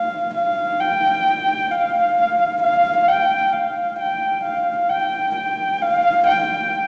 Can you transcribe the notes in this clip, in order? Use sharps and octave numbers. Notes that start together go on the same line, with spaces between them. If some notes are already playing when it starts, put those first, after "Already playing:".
Already playing: F5
F5
G5
F5
F5
G5
F5
G5
F5
G5
G5
F5
G5